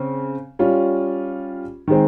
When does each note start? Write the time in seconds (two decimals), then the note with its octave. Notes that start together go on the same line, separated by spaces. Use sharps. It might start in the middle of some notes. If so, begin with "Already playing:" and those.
Already playing: C#3 C4
0.59 G3 C#4 F4
1.88 D#3 G#3 C4